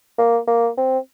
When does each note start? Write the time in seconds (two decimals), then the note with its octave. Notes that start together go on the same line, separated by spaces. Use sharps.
0.18 A#3
0.47 A#3
0.78 C4